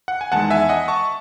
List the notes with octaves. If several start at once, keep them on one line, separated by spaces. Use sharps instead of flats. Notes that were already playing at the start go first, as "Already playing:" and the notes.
F#5
G#5
E2 D#3 G#3 F#5 A5
E5 G#5
D#5 F#5
A5 C#6